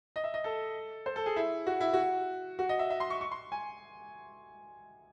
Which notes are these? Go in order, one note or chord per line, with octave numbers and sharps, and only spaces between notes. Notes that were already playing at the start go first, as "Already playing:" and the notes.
D#5
E5
D#5
A4
C5
A4
G#4
E4
F#4
E4
F#4
F#4
D#5
E5
E5
C6
C#6
C#6
C6
G#5